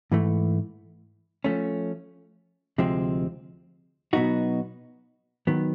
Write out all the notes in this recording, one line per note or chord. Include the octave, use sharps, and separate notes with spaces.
G#2 E3 A3
F3 A3 C#4
D2 C3 F3 G#3 C4
B2 F#3 B3 D#4 F#4
D#3 F#3 B3